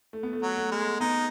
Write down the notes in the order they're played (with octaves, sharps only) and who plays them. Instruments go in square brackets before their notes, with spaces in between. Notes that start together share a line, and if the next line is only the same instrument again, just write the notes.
[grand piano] A3
B3
A3
[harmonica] F#3
[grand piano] A3
[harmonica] G#3
[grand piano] B3 [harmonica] D#4